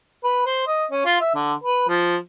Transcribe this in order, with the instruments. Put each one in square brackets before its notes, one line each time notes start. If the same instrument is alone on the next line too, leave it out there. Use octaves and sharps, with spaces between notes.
[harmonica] B4
C5
D#5
C#4
F4
E5
D3
B4
F3